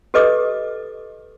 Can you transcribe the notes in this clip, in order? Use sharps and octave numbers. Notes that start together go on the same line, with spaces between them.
G4 A4 B4 D#5 D6 D#6